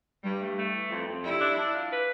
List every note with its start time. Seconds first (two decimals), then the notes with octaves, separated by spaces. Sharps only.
0.23 G2 G3
0.40 A3
0.57 A3
0.74 E3
0.90 F2
1.07 F2
1.24 G3 E4
1.40 D4
1.58 D4
1.74 F4
1.91 B4